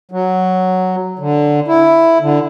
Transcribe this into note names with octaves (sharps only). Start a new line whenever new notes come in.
F#3
D3
E4
D3